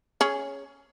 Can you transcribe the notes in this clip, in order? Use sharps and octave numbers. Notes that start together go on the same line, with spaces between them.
C#4 G#4